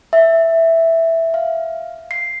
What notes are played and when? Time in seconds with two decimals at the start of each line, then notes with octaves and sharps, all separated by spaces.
0.13 E5
1.34 F5
2.11 C7